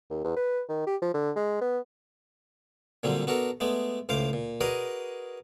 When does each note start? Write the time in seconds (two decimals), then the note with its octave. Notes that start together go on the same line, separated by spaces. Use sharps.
0.11 D#2
0.24 E2
0.36 B4
0.69 D#3
0.87 G4
1.02 F3
1.14 D3
1.36 G#3
1.61 B3
3.03 A#2 D3 F#3 G3 C4
3.27 B3 D4 F#4 A4 A#4
3.60 G#3 A3 B3 D5
4.09 C#2 A2 C5 F5 D6
4.33 A#2
4.61 F#4 G#4 A#4 B4 D5 D#5